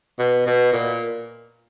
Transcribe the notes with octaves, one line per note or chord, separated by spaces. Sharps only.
B2
B2
A#2